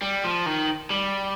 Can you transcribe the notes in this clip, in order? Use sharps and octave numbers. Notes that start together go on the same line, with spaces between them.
G3
F3
D#3
G3